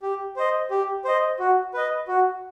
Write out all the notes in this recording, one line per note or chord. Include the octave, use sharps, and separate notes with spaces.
G4
C5 D#5
G4
C5 D#5
F#4
B4 D#5
F#4